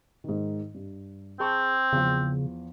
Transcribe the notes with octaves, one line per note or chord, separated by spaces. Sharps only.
G#2 D#3
G2
C4 G#4 A5 C#6
E2 C#3 F3